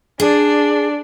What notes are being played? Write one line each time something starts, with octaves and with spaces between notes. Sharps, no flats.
D4 G#4 D5